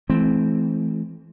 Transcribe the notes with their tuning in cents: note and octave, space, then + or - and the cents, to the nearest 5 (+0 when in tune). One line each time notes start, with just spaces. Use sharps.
E3 +0 A3 -35 C4 +0